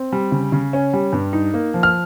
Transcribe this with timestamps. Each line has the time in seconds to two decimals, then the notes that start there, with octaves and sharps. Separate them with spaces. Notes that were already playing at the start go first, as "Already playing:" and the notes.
Already playing: C4
0.12 G3
0.32 C#3
0.52 C#3
0.73 C#4
0.93 G3
1.13 G2
1.33 D#4
1.54 A#3
1.74 F3
1.83 F6